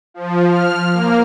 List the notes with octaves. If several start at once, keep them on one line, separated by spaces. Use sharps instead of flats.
F3
F6
A#3